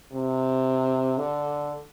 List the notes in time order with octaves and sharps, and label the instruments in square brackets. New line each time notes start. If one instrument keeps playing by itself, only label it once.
[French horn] C3
D3